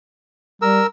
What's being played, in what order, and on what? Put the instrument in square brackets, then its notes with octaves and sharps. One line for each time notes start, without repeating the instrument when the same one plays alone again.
[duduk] G3 [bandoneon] A#4 E6